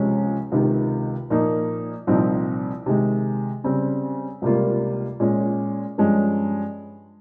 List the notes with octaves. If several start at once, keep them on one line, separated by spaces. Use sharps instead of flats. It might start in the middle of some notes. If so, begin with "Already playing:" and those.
Already playing: C#2 C3 F3 G#3 C#4
C#2 C3 D#3
A#2 F3 A#3 D#4
C2 A#2 F3 C4 D#4
C3 D#3 G#3
C#3 G3 C4
C#2 C3 G3 A#3 F4
A#2 G#3 C#4
G2 F3 G#3 C#4